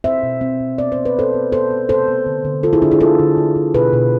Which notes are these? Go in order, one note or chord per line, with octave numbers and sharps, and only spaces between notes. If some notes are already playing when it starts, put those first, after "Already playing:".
C4 C5 E5
B2
C4
B2
B3 D5
C5
B3
B4
B3 A4 C5
B3
B3 A4 C5
B3
C3 A4 C5
B3
D3
D3
D3 F4 A4
E4 G#4
D3 D4 F4
E4 G#4
D3 F4 A4
D3
D3
D3
B2 G#4 B4
B2